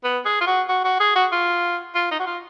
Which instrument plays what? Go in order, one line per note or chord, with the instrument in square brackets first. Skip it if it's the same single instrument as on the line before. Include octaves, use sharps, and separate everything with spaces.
[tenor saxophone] B3
G#4
F4
F#4
F#4
F#4
G#4
F#4
F4
F4
D#4
F#4
F4